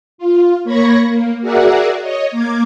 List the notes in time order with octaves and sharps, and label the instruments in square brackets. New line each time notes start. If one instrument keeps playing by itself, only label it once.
[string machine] F4
A#3 C#5 B5 G#6 A#6 C#7
A#3
F#4 G#4 A#4 D5 E5 F#5
C#5 D#5
A#3 D6 G#6